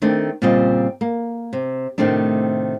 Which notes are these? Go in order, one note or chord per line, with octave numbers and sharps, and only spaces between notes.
D#3 A3 C4 D4
A#2 C#3 G3 C4 F4 D#5
A#3
C3
A2 C3 D#3 A3 C4 D4